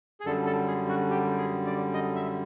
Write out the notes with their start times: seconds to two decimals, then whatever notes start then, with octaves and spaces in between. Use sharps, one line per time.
0.20 G#4
0.25 F#2 D3 G3 A4
0.46 A4
0.67 G#4
0.89 F#4
1.10 G4
1.38 G#4
1.66 D5
1.94 D#5
2.15 E5